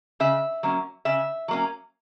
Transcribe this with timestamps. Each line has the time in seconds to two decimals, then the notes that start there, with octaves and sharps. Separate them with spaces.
0.20 C#3 E5
0.63 F#3 A#3 C#4
1.05 C#3 E5
1.48 F#3 A#3 C#4